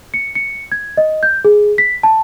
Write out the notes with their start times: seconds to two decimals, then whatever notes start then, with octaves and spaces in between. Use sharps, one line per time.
0.14 C#7
0.35 C#7
0.72 G#6
0.97 D#5
1.23 G6
1.45 G#4
1.78 B6
2.03 A5